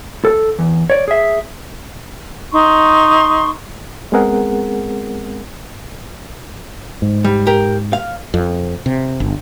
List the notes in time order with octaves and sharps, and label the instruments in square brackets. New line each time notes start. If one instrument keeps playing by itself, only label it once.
[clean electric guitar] A4
E2
C#5 D5
G#4 E5
[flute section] D#4 C6 C#6
[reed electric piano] G#3 B3 C4 G#4 A#4 F#5
[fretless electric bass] G#2
[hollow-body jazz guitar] G3
G4 A#4
F5
[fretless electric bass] F2
C3
G1